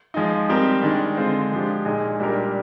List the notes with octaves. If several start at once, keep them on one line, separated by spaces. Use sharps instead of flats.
F3 G#3 D#4
G3 C4 G4 A#4
D#3 G#3 D4
D3 G#3 C4 F4 C5
F3 G#3 D4 G4
A#2 G#3 D#4 G#4
A#2 G3 D4 G4 A#4